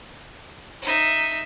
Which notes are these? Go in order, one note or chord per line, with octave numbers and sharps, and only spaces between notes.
D#4 E5